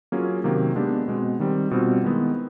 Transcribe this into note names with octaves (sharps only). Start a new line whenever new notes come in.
F#3 A#3 C#4 F4 G#4
C3 D#3 F#3 A#3
G#3 B3 D4 G4
B2 G#3 C4
D#3 G3 C4
B2 G3 C4 F4
D#3 G#3 B3 E4